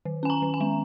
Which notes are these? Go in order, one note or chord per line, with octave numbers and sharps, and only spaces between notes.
D#3
C#4 G#5
A#5
D#3
G#5
G#3